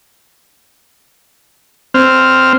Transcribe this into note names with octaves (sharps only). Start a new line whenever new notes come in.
C4 F6